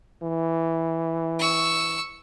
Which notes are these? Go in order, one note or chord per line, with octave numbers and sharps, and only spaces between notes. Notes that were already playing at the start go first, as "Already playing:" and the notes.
E3
C#6 E6